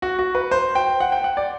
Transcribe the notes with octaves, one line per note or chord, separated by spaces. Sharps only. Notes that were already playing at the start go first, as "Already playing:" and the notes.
F#4
F#4
B4
C5
G5
F#5
G5
F#5
D5